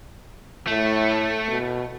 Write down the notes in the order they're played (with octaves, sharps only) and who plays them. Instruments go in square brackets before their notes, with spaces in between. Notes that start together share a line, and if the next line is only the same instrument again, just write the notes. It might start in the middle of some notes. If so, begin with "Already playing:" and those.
[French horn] A2 [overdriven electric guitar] A3
[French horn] B2